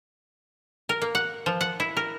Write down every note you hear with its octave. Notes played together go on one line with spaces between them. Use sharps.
A#4
A#3
F#5
F3
F#5
E4
A#4